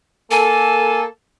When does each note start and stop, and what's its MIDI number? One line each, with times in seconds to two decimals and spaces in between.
0.31 1.04 58
0.31 1.04 69
0.31 1.01 80